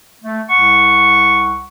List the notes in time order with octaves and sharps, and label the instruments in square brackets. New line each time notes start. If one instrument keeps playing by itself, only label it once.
[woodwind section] A3
C2 F#5 C#6